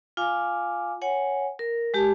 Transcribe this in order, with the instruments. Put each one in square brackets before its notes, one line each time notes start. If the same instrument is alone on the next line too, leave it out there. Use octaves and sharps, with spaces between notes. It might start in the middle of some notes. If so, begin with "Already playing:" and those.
[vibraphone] F4 F5 G#5 D6
C#5 F#5 G#5
A#4
G#3 G4 G#5 A5